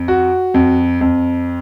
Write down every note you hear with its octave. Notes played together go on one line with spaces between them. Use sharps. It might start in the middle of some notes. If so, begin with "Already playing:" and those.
Already playing: F2
F#4
F2
F2